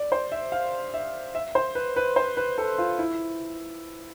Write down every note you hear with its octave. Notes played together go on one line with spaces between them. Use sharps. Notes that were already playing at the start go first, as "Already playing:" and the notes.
Already playing: D5
C5
E5
F5
E5
E5
C5
B4
B4
C5
B4
A4
F4
E4